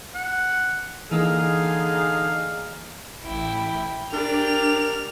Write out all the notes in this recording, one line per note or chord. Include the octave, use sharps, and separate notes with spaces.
F#5
D3 E3 A#3 D#4 G#4 F5
A1 E4 G5
D4 G4 A#4 D5 F7